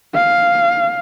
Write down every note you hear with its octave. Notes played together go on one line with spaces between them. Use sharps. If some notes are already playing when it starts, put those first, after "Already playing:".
F5